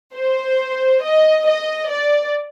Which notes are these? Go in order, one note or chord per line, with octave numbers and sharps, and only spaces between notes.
C5
D#5
D#5
D5